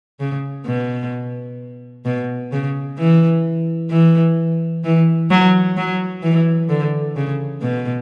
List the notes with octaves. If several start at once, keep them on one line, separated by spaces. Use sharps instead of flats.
C#3
B2
B2
C#3
E3
E3
E3
F#3
F#3
E3
D3
C#3
B2